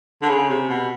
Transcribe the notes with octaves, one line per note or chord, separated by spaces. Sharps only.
D3
C#3
C3
B2